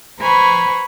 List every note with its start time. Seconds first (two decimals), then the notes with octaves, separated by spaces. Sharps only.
0.20 B4 C5 G#5 A#5 B5 C#6